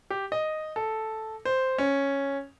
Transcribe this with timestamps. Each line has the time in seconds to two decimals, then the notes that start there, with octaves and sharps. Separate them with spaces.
0.10 G4
0.32 D#5
0.76 A4
1.45 C5
1.78 C#4